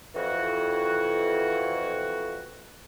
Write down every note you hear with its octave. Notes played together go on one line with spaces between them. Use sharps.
F2 E3 F#4